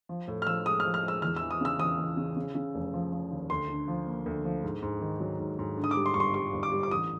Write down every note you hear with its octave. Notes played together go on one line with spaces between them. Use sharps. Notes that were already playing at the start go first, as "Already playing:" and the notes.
F3
A2
F6
F3 E6
G#3 D#6
F3 F6
F6
G#3 E6
E2 F6
E3 E6
D#6
C#3 E6
E2 D#6
E2
C#3
C#3
C#3
F1
F3
F3
D#2
D2 C6
D3
F3
A#3
D2
F3
G#2
G#2
D#3
F#3
G#2
G#2
D3
D#6
D6
G3
C6
G1 C#6
C6
G3 C#6
G1
D6
G3
D6
A1 D#6